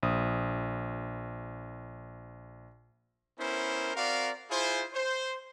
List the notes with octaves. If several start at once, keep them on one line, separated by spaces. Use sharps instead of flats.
A#1 D#6
B3 C#4 E4 A#4 C5
C4 F#4 A#4 D5 F5
E4 F4 G#4 C5
C5